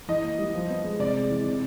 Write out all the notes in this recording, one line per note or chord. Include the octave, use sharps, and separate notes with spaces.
E3 D#5
A#3
G3
F3
B3
G#3
C3 D5
G#3
E3
C3